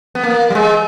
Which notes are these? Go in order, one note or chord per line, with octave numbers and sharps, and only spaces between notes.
B3
A#3
G3
G#3